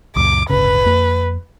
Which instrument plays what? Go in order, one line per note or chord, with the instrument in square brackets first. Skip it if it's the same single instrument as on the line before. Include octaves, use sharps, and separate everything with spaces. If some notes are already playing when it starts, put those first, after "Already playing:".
[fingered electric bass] C#2 F#2 A#2 [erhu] D6
[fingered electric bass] D1 G1 C#3 [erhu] B4
[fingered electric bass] F2 A#3